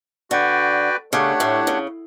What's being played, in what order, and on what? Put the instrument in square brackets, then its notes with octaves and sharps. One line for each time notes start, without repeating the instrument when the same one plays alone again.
[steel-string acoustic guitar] D3 [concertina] F#4 B4 D5 G5
[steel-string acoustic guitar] C#3 [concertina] A3 D4 G4 C#5 F#5
[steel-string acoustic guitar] A2
C#3